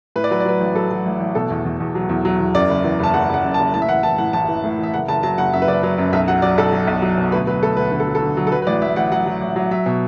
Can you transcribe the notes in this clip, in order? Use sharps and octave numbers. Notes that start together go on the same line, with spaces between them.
A2 B4
D5
F#3 B4
D5
F#3 B4
A1
F#3 A4
F#3
A1
A1
B2 A4
E2
E2
E2
F#3
E2
F#3
E2
F#2 D5
F#1
E3
F#1 A5
F#1 F#5
F#1 F#5
F#2
A5
F#1
A2 A5
E5
E3 F#5
E3 A5
A2 F#5
A1 A5
E3
A2
E3 E5
F#1 F#5
F#1 A5
F#3 A5
F#1 F#5
F#2 E5
B4
F#1 D5
F#3 B4
F#2
B1 E5
F#3 F#5
F#3 D5
B1 A4
F#3
B1
F#3
B2
D2 B4
F#3 B4
D2 A4
D2 B4
D3 B4
A4
F#3
A4
D3
F#3
A4
F#3 B4
B4
A1 D5
A1 E5
A1 F#5
F#3 F#5
F#3
A1
F#3
F#3 E5
B2